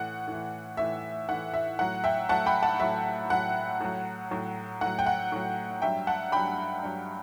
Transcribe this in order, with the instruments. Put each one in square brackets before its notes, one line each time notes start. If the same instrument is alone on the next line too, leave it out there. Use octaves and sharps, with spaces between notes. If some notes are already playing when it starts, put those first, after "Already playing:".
Already playing: [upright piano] A2 E3 F#5
A2 E3
A2 E3 E5
A2 E3 F#5
E5
A2 F#3 F#5
E5 G5
A2 F#3 F#5 A5
G5 B5
F#5 A5
A2 F#3 E5
A2 F#3 F#5
A2 F#3
A2 F#3
A2 F#3 F#5
G5
F#5
A2 F#3
G2 F#3 E5 G5
F#5 A5
G2 F#3 G5 B5
G2 F#3